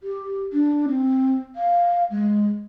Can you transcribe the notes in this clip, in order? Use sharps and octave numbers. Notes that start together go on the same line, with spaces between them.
G4
D4
C4
F5
G#3